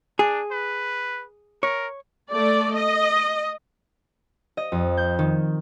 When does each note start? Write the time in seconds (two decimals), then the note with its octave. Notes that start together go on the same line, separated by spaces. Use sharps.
0.19 D4 G#4
0.52 B4
1.63 A#4 C#5
2.30 A3 D5
2.75 D#5
4.57 D#5
4.72 F2
4.97 G6
5.19 D#3